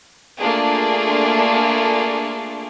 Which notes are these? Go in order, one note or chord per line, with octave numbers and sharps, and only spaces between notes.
A3 A#3 D4 F4 G#4